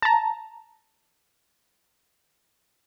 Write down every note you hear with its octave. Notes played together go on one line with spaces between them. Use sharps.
A5 A#5